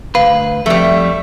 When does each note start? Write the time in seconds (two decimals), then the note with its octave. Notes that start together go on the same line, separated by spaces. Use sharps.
0.15 D2 B4 F5
0.66 F2 G3 A3 E5